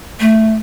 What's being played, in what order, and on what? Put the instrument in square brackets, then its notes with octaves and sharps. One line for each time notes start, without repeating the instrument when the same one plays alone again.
[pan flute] A3